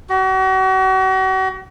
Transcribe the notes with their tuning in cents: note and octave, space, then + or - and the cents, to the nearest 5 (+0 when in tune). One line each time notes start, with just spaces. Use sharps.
F#4 +40